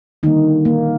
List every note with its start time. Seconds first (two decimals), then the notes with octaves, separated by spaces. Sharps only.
0.23 D3 D#3 G3 A#3 D#4
0.65 A#3